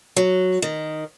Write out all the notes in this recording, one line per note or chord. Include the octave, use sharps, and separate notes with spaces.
F#3
D#3